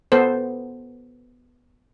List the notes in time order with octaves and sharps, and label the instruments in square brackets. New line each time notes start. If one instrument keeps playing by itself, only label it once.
[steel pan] B3 A4 C5